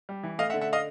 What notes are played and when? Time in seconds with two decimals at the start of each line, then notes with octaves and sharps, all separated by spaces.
0.09 G3
0.23 E3
0.38 A3 D#5 F5
0.50 E5 F#5
0.54 D3
0.61 E5 F#5
0.73 D#5 F5